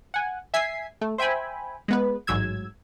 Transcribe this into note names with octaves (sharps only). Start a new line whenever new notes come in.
F#5 G#5
E5 G#5 G#6 B6 C7
A3
C5 E5 G5 G#5 B5
G#3 B3 B4
A1 G#2 F#3 E6 G#6